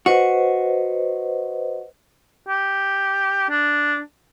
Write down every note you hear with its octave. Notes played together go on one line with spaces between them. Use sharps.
F#4 B4 C5 D#5
G4
D4